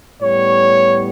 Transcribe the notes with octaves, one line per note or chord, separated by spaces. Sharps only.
A2 G3 B3 C#5